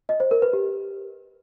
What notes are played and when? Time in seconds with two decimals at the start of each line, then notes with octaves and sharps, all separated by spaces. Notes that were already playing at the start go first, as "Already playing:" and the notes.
0.09 D#5
0.20 C5
0.31 A#4
0.42 B4
0.53 G4